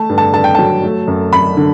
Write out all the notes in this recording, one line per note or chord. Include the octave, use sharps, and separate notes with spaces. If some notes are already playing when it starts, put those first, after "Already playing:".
Already playing: A3 A5
G2
A5
G2 A5
G5
F#3 A5
A3
F#2
F#2 B5
D3